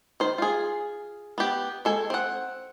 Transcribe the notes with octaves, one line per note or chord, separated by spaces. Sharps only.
D#3 C5
F4 G#4
B3 G4
G#3 A4 G#5
C4 F#5